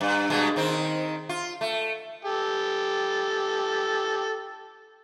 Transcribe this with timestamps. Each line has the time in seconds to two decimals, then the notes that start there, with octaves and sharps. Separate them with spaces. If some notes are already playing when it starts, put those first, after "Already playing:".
0.01 G2
0.30 G2 B2 G#3
0.56 D#3 C4 D#4
1.29 F4
1.61 A3
2.25 G4 A4